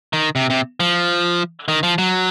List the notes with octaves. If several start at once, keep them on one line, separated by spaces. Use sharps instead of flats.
D#3
C3
C3
F3
D#3
F3
F#3